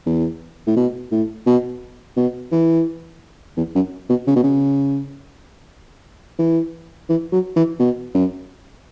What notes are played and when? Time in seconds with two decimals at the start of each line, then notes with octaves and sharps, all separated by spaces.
0.06 E2
0.67 A2
0.76 B2
1.11 A2
1.46 B2
2.17 B2
2.52 E3
3.57 E2
3.75 F#2
4.10 B2
4.27 C#3
4.36 B2
4.44 C#3
6.39 E3
7.09 E3
7.32 F#3
7.56 E3
7.79 B2
8.14 F#2